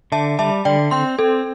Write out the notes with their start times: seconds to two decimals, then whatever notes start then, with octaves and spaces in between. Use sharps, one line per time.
0.12 D3 E5 A5
0.39 G3 E5 A5
0.65 D3 D5 G5
0.91 C4 G5 C6
1.19 C4 A4